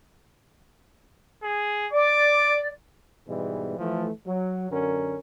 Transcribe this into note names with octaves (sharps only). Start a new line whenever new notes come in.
G#4
D5 D6
G#2 B2 E3 G3 G#3
E3 F3 A3
F#3
F#2 D3 C#4 A#4